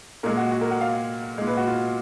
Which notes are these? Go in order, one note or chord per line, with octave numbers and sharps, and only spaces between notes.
A#2 G#3 A#4
F#4
F#4
A#4
F#5
F5
A#2 G#3
B4
F#4
F4